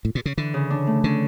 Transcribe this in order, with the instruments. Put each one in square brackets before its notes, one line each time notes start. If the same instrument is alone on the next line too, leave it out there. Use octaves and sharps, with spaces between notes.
[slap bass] A2
A#2
C#3
[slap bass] D3 [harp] E3
[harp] C#3
D4
A3
[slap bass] D3 [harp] C#4